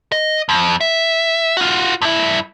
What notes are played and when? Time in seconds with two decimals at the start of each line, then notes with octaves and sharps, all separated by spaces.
0.12 D#5
0.49 F2
0.81 E5
1.57 F4 F#4
2.02 G2 E4